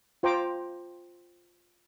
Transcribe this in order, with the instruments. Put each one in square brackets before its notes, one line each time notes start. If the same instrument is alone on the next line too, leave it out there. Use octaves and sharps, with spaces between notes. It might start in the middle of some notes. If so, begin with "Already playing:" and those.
[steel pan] F4 C5 G5 A#5 D6